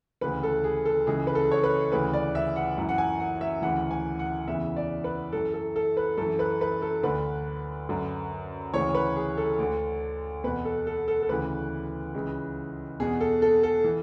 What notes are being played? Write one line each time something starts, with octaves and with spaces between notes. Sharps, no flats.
D2 C#3 E3 B4
A4
G#4
A4
C#2 C#3 E3 G#4
B4
A4
C#5
B4
D2 C#3 E3 B4
D5
E5
F#5
F#2 E3
F#5
G#5
F#5
E5
D2 C#3 E3 F#5
G#5
F#5
E2 C#3 E3 E5
D5
B4
F#2 E3 A4
A4
A4
B4
F#2 E3 A4
B4
B4
A4
D2 D3 B4
F#2 D3
D2 C#3 E3 C#5
B4
G#4
A4
D2 D3
E2 B2 B4
A4
A4
A4
A4
D2 C#3 E3 B4
C#2 C#3 E3
E2 B2 G#4
A4
A4
A4
E3